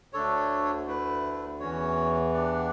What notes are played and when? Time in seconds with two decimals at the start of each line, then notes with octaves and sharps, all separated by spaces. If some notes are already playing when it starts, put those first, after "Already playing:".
0.13 D2 D3 A3 D4 A4 C#5
0.86 A3 E4 B4
1.60 E2 E3 C#4 F#4 C#5
2.33 D4 G4 D5 F#5